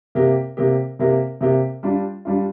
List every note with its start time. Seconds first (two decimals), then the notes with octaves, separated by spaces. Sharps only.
0.15 C3 A#3 G4
0.57 C3 A#3 G4
0.99 C3 A#3 G4
1.41 C3 A#3 G4
1.83 G3 D4 F4
2.25 G3 D4 F4